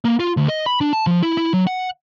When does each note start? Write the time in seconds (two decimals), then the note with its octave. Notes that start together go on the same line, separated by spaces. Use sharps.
0.05 A#3
0.20 F4
0.37 D2
0.49 D#5
0.66 B5
0.81 D4
0.93 A5
1.07 F3
1.23 E4
1.37 E4
1.53 F#3
1.67 F#5